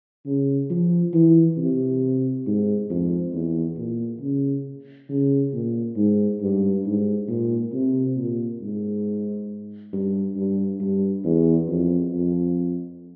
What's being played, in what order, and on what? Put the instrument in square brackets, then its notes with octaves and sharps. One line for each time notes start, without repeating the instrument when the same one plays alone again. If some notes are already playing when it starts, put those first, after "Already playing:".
[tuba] C#3
F3
E3
C3
G#2
F2
E2
A#2
C#3
C#3
A#2
G#2
G2
G#2
A#2
C3
A#2
G#2
G2
G2
G2
E2
F2
F2